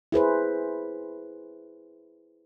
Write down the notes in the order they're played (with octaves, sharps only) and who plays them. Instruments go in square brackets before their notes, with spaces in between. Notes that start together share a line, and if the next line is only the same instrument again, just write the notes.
[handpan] E4 G#4 B4 C5